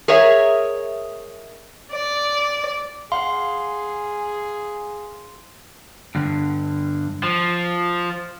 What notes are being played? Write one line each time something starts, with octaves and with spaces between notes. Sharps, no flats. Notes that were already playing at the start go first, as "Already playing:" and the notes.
G#4 A#4 C#5 D#5 E5
D5
G#4 F5 F#5 C6
G2 D3
F3